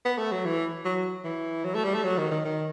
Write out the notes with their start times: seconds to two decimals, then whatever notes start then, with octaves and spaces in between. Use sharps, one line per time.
0.06 B3
0.19 A3
0.32 F#3
0.45 E3
0.85 F#3
1.25 E3
1.64 F#3
1.75 A3
1.85 G3
1.94 A3
2.04 F#3
2.18 D#3
2.31 D#3
2.45 D#3